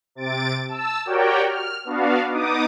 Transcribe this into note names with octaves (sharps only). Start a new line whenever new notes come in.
C3 A6 D7
A5 E6
F#4 G4 A#4 C#5 D5 G5
F6
B3 D4 F#4 F5
B3 D#4 D6 D#6